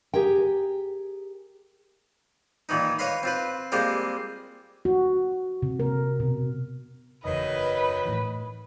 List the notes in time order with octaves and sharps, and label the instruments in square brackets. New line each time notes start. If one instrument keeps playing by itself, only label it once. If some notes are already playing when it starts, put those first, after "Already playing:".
[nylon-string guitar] G4 G#4 A#4 G5
[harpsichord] A#2 D#3 E3 D#4
B4 C#5 D#5 F5 B5 C6
C4 F4 B4
G3 G#3 A#3 C4 F4 G#4
[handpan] F#4
C3
A#4
B2
[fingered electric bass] F#1 E2 [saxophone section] D#3 F#3 D#5 [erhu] B4
[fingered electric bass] A2 E3